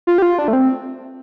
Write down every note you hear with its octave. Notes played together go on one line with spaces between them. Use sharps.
F4
G4
F4
D4
A3
C4